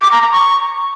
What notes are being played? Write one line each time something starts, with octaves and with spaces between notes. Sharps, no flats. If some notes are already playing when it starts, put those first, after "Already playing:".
D6
A#5
A#5
C#6